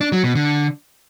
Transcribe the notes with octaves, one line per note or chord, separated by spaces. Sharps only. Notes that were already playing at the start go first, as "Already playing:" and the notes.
D4
F#3
B2
D3